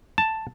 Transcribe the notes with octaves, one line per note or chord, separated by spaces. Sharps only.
A5